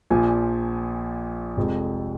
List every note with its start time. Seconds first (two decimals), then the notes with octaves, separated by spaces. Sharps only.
0.10 A#1 A#2 F3 G#5
1.57 F1 F2 F3 G#3